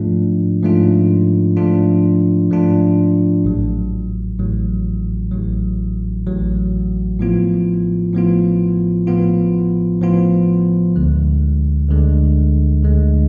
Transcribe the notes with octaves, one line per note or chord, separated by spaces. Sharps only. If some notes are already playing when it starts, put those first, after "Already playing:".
Already playing: G#2 F3 A3 D4 F4
G#2 F3 A3 D4 F4
G#2 F3 A3 D4 F4
G#2 F3 A3 D4 F4
A1 A2 F#3
A1 A2 F#3
A1 A2 F#3
A1 A2 F#3
A2 F3 B3 F4
A2 F3 B3 F4
A2 F3 B3 F4
A2 F3 B3 F4
D2 D3 G#3
D2 D3 G#3
D2 D3 G#3